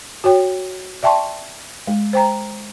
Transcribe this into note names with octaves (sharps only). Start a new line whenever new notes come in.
F#4 C#5 G5
D5 E5 G5 A5 C6 C#6
G#3
C5 G5 A#5